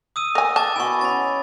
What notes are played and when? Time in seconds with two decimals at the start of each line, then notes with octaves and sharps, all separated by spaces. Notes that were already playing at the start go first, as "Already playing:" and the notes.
0.16 D#6 E6 D#7
0.35 A#4 G#5
0.56 A5 D6 A6
0.76 B2 E4 G#5 C#6
1.01 C#4 C#5 B5 A6